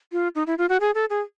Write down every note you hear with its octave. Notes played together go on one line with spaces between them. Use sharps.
F4
D#4
E4
F4
F#4
G#4
A4
G#4